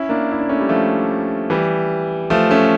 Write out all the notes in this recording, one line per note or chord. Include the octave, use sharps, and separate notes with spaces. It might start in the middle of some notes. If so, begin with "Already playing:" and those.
Already playing: C#4 E4
A#3 D4
E4
D4
A3 C#4
G3
F3 A3
E3 G3
F3 A3
A3 C#4